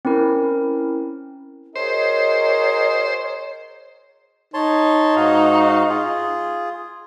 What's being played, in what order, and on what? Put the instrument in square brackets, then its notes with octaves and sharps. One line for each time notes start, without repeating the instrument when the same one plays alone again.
[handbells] C4 C#4 E4 A#4
[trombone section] F#4 G#4 A#4 [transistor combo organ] C5 [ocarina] C#5 [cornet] D#5
[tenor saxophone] D#4 [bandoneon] C#5 A5 C6
[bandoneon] G#2 F#4 F5
F4 G#4